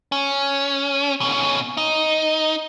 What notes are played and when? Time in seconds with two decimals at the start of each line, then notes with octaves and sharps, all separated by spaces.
0.12 C#4
1.21 B2 C#4
1.77 D#4